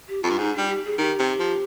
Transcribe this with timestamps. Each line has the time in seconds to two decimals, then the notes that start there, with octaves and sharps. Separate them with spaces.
0.08 G4
0.23 F2 F4
0.30 G2
0.38 G#2 D#4
0.53 G3 D4
0.69 G4
0.84 G#4
0.98 D#3 G4
1.20 C3
1.40 F3